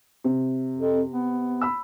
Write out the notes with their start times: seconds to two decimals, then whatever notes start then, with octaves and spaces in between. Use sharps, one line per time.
0.24 C3
0.76 F2
1.09 B3
1.61 B5 E6